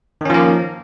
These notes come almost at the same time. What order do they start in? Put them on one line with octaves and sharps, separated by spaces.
D#3 C#4 F3 A#3